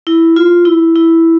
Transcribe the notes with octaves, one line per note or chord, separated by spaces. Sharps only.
E4
F4
E4
E4